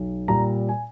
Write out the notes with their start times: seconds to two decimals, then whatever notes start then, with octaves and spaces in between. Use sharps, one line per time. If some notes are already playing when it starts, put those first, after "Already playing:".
Already playing: B1
0.28 A#2 G3 A#5
0.69 G#5